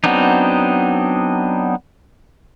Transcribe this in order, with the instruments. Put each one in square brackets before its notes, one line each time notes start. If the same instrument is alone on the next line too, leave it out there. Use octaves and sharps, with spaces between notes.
[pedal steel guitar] F#3 B3 C4 D4 D#4